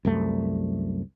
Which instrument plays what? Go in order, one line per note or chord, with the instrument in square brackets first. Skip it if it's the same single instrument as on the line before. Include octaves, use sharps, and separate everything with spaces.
[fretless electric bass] C2 F#2 A3